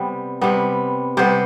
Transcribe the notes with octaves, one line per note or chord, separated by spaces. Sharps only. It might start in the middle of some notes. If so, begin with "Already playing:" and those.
Already playing: C3 G3 B3
C3 G3 B3
C3 G3 B3 C5